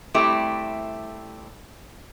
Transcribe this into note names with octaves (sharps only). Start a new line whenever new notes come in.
G3 A3 C4 E4 G4